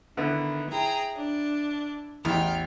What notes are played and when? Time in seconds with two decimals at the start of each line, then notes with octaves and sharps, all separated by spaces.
0.17 D3 D#3 B3 E4
0.69 E4 G#4 G5 A#5
1.17 D4
2.25 A1 E2 G5 F6